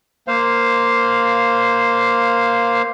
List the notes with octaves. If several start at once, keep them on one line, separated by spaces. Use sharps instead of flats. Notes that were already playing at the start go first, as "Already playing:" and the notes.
A#3 C5 F5